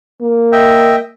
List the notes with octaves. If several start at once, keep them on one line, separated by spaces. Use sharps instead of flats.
A#3
D#5 E5 G5